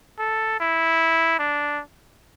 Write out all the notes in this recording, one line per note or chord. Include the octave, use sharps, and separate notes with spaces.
A4
E4
D4